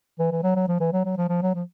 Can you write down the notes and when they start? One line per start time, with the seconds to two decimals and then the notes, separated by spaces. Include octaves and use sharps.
0.19 E3
0.31 E3
0.43 F#3
0.56 F#3
0.68 F3
0.80 E3
0.93 F#3
1.05 F#3
1.18 F3
1.29 F3
1.42 F#3
1.55 F3